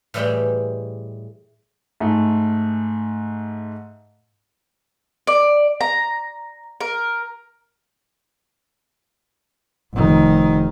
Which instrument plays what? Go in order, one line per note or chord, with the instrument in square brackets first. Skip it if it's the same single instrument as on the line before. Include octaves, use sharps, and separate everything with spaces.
[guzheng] A2 E3 G3 G#3 G4 G5
[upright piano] G#2 A3
[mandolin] D5
A#5
A#4
[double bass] F1 D#3